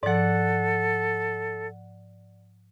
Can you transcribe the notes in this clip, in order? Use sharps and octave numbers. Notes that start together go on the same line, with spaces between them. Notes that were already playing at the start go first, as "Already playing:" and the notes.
G#2 F3 A4 D5 F#5